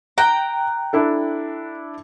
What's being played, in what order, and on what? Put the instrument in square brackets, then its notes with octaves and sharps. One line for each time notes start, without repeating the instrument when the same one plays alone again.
[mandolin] G5 A#5 [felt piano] F#6
[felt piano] D4 E4 A4